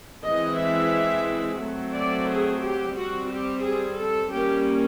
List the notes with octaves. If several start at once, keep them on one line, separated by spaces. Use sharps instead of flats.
E3 G#3 C4 D#5
E5
F#3 A3 C4
D5
G#4
G4
G3 C4 F#4
G4
G#4
A4
G3 A#3 C#4 G4